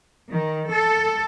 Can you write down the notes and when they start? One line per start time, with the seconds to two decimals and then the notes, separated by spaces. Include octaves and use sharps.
0.31 D#3
0.69 A4